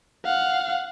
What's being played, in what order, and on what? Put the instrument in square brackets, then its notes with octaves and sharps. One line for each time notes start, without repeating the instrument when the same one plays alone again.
[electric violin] F5 F#5